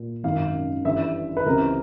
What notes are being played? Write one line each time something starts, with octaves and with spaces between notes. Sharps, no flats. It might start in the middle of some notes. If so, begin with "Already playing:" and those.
Already playing: A#2
G#1 F#2 D#3 F5
G1 G2 E3 E5
B4
C#2 C3 E3 A#4